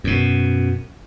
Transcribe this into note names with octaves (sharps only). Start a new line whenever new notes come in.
F#2 B2